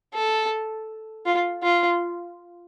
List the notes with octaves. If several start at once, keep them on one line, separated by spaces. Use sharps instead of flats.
A4
F4
F4